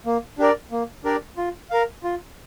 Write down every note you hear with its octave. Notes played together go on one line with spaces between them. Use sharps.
A#3
D4 G4 A#4 D5
A#3
D4 G4 A#4 D5
F4
A#4 F5
F4